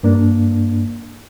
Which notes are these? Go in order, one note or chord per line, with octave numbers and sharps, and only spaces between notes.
G2 A#3 D4